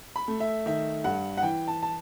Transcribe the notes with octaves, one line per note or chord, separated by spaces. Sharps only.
B5
A3
E5
D#3 E5
G2 F#5
F#5
E3 G5
A5
A5